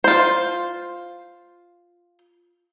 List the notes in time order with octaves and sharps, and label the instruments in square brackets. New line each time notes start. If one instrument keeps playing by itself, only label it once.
[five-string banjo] F4 C5